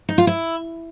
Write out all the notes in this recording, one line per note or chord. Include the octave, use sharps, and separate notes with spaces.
D#4
F4
E4